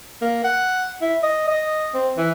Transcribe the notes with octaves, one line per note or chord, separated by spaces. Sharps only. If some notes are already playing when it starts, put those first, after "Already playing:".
A#3
F#5
E4
D#5
D#5
C4
E3